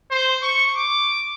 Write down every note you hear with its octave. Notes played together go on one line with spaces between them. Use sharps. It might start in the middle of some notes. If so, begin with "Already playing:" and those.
C5
C#6
D6